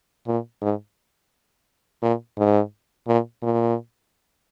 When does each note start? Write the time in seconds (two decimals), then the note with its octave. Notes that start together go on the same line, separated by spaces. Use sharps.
0.28 A#2
0.62 G#2
2.03 A#2
2.38 G#2
3.08 A#2
3.43 A#2